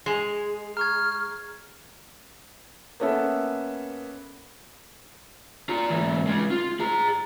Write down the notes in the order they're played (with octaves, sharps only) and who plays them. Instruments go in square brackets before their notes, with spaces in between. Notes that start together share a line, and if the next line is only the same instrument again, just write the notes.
[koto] G#3 [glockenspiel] C7 F7
[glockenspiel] A#5 C#6 G#6 [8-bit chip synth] F6
[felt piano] A#3 B3 C#4 A4 E5
[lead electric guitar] F4 A#5
G#2 E3
G#3 C#4
F4
G#4 A#5